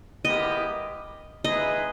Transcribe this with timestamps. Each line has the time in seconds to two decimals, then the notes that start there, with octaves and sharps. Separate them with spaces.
0.25 G#3 B3 E4 G4 A#4 D#5
1.44 G#3 D#4 G#4 B4 D#5 E5